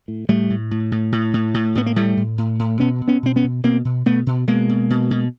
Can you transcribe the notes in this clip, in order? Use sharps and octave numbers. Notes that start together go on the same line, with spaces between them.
A2
A2 G3 A3
A2
A2
A2
A2
A2
A2
A2 B3
A#3
A2 G3 A3
A2
A2
A2
B2 B3 C#4
B2
B3 C#4
B2 C4
B3 C#4
B2
B2 A#3 C4
B2
B2 A3 B3
B2
B2 G#3 A#3
B2
B2
B2